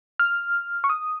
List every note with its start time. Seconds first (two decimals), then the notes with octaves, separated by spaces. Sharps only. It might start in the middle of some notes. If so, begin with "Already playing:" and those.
0.19 F6
0.84 C#6
0.89 D#6